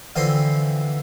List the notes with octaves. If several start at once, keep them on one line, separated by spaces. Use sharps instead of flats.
D3 E3 F3 C4 C6 D#6